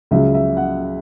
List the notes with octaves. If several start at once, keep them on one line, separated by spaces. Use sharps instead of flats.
C#2 C#3 F#3 E5
E5
F#5